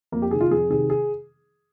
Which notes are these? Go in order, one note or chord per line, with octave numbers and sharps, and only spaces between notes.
F2 A#3
G4
C3 D#3 G#4
F4
F2 G#4
C3 D#3 G#4
G#4